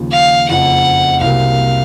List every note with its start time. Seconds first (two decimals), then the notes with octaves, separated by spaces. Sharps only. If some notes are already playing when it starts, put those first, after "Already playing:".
Already playing: D#2 C#3 F3
0.12 F5
0.49 F#1 F2 C#3 F#5
1.21 C2 C3 F#3 A#3 F5